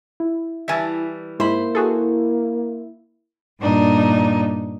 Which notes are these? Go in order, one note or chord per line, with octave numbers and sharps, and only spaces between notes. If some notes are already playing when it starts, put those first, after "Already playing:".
E4
E3 G3 E5 G#5 A5
G#2 A#3 E4 C5 B5
F#4 G#4 A4
G2 A#2 D4 D#4